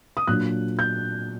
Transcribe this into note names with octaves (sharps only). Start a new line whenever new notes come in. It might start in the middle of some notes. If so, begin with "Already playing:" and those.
D#6
A#2 F#3 A#3 D4 F#6
G6